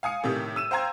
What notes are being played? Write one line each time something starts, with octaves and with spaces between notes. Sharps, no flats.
F5 G#5 D#6 C#7
A2 C3 D#3 G4
E6 D#7 E7
C5 F5 G5 A#5 C6 G#6